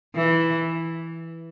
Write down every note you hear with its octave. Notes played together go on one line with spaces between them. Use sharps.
E3